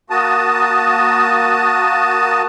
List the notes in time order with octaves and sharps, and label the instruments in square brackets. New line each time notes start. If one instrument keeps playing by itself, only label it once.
[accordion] A#3 F#4 A5 D#6